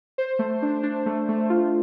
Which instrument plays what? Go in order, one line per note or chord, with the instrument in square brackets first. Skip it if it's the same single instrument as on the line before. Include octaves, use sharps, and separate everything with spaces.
[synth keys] C5
A3
D4
D4
A3
A3
F4